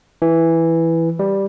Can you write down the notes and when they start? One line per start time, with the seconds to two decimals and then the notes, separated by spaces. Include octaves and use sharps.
0.22 E3
1.19 G3